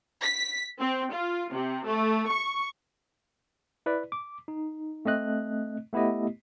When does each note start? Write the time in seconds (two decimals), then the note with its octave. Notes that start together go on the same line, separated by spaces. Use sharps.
0.22 B6
0.79 C4
1.12 F4
1.52 C3
1.86 A3
2.28 C#6
3.86 E4 B4 D5
4.12 D6
4.48 D#4
5.05 A3 C4 D#5 F#6
5.93 A3 B3 E4 G4 D#5